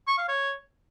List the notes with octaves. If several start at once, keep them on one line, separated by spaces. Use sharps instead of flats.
C#6
F5
C#5